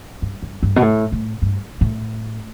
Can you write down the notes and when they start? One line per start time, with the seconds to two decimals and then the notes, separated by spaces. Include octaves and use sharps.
0.22 G2
0.42 G2
0.63 G2
0.76 B2
0.82 A2
1.12 A2
1.42 G2
1.81 A2